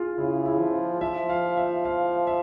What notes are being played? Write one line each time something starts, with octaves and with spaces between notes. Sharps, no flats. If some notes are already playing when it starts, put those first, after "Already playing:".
Already playing: F4 G#4
C#3 E4
E4
F3
F3 E5
F5
E5
F5
E5